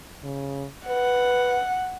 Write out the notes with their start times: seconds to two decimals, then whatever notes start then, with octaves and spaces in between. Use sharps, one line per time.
0.24 C#3
0.88 B4 F#5